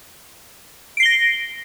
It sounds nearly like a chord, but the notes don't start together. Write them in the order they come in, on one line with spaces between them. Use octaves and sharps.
D7 C7 G7 A#6